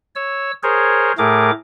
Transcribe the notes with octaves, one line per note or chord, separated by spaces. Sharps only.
C#5 E6
G#4 A#4 C5 C#5
A2 A3 G#4 A#4 D6